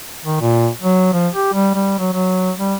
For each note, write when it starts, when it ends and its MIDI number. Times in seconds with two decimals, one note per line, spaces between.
0.25 0.41 51
0.41 0.69 46
0.81 1.13 54
1.13 1.28 53
1.34 1.53 67
1.54 1.70 55
1.75 1.98 55
1.99 2.09 54
2.13 2.51 54
2.58 2.75 55